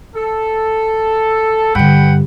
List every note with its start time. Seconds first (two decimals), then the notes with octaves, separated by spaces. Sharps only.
0.15 A4
1.75 G2 D3 B4 F#5 G5